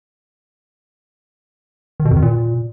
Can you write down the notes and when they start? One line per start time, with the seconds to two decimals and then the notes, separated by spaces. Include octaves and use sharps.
2.00 D#3
2.05 B2
2.11 F2
2.17 D#3
2.22 A#2